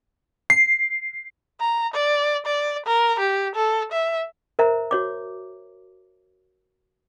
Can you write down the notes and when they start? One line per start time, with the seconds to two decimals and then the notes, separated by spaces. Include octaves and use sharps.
0.50 C7
1.60 A#5
1.94 D5
2.46 D5
2.86 A#4
3.20 G4
3.55 A4
3.92 E5
4.59 A#4 C5 E5 A#5
4.91 F#4 C#5 D6